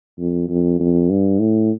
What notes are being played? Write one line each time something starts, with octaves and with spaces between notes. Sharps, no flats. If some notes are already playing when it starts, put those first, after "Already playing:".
F2
F2
F2
G2
A2